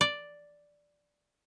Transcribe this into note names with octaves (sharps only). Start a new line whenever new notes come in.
D5